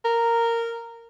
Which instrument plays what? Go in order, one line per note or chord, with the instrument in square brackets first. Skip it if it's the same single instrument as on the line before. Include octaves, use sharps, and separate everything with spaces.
[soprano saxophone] A#4